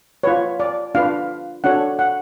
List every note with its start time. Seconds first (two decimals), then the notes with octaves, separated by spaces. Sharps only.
0.23 F4 B4 C#5
0.60 D5
0.95 D4 F4 B4 F5
1.64 D4 F#4 A4 C#5 F#5
1.99 F#5